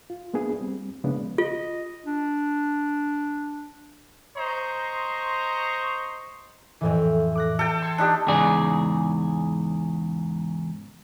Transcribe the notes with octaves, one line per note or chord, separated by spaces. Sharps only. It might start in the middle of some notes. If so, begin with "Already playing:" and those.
F4
A#3 B3 D4 G#4
G3 C4
C#3 F3 G#3 A#3 B3 D4
F4 D#5
D4
C5 D#5 A#5 C6 C#6
F2 A2 E3
D6 F#6 A#6
A4 G5
C6 G#6 C#7
D4 D#4 G4
E2 G#2 C#3 G#4 D5